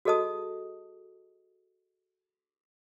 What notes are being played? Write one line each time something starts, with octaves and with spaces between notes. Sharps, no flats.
F#4 G#4 A4 D#5 A5 D#6